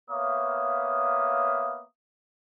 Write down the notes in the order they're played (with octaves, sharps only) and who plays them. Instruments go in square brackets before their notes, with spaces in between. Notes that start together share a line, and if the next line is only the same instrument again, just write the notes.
[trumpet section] A#3 B3 C#5 E5 F5 D#6